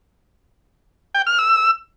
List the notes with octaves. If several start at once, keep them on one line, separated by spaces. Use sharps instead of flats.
G5
F6
E6